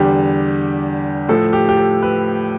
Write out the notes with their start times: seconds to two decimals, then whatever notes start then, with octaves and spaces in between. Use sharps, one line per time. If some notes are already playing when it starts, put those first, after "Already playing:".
Already playing: E2 D3 G3 G4
1.29 A2 F3 A4
1.53 G4
1.69 G4
1.77 A4
2.03 B4